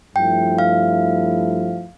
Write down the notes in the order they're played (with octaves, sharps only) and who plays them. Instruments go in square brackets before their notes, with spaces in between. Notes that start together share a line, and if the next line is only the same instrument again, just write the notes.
[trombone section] G2 F3 A3 E4 [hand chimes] G5
[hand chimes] F5